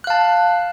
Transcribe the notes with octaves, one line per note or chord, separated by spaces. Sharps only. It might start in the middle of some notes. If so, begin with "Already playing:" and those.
F5 A5 F#6